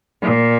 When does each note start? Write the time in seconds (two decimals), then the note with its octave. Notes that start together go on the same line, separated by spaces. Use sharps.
0.22 A#2